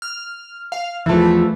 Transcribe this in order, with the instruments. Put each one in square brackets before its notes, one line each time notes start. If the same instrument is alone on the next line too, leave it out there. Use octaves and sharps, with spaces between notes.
[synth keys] F6
F5
[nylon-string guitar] E2 F3 [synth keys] E3 A3